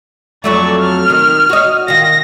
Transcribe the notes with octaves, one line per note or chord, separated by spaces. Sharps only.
F2 F#3 A3 D5 C#6
F6
D#3
F#4 D#5
D#3 F4 A#6